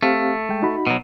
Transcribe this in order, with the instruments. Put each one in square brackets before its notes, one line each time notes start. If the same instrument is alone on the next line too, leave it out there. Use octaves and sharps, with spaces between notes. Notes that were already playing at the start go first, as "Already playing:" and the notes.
[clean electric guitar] A3 [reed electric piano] C4 G4 F5
[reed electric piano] G#3 G5
D#4 F#4 B5
[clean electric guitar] B2 F#3